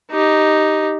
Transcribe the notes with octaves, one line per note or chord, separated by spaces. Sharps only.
D#4 G4